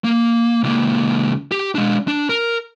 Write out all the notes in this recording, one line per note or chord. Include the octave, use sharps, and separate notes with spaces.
A#3
C#2 A#3
G4
G#3 D4
D4
A#4